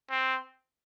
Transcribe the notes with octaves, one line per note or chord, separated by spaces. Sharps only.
C4